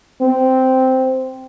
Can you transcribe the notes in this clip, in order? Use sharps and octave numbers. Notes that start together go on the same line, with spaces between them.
C4